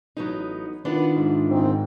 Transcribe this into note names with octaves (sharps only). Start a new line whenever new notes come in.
A1 F#3 B3 D#4
D#3 B3 D4 E4 F4
G#2
F#1 D#3 C4